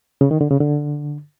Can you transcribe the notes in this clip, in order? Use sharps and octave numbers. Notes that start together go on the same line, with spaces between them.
C#3
D#3
D3
C#3
D3